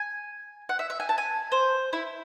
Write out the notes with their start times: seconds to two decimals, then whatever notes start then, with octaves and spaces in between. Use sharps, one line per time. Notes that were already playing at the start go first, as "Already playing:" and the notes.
Already playing: G#5
0.69 F#5
0.79 E5
0.90 E5
1.00 G#5
1.09 A5
1.18 G#5
1.52 C5
1.93 E4